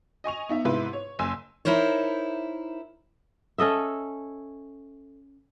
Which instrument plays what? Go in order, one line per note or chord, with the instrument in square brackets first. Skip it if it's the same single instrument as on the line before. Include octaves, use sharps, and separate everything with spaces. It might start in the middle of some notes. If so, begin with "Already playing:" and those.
[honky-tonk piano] D#5 G#5 C#6 F7
B3 D#4 E5
G#2 C3 E4 B4 C6
C#5
F#1 G#5 C6 E6
[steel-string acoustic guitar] D#4 E4 A#4 C5 C#5
[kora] C#4 A4 D#5 E5